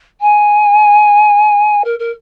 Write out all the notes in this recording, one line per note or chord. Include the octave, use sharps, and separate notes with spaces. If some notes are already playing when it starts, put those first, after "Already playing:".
G#5
A#4
A#4